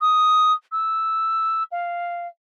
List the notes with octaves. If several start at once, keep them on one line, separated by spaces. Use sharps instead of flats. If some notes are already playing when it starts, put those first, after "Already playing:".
D#6
E6
F5